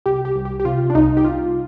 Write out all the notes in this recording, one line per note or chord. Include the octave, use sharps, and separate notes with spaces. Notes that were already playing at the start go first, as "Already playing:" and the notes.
C2 G4
G4
C2
G4
G4
C3 F4
D4
C2 D#4
G4
C2 F4